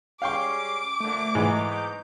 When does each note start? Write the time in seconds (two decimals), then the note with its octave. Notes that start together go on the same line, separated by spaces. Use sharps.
0.22 G3 G#3 C#4 F5 G5 C#6 D6 C7
1.00 F2 A#2 D3 A3
1.35 G#2 B2 E3 F#3 D#4
1.71 G6